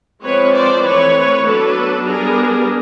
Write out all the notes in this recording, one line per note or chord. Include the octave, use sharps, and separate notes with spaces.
F3 G#3 C4 B4 C#5
C5 D5
E3 A3 C4 B4 C#5
F#3 B3 D4 A4 B4
G3 B3 D4 G#4 A#4